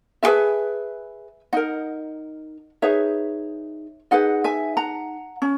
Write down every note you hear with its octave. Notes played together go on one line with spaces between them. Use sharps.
E4 G#4 B4 E5 G#5
D#4 A#4 D#5 F#5
D#4 G#4 B4 C#5 E5
D#4 G#4 B4 D#5 F#5
E5 G#5
F#5 A#5
C#4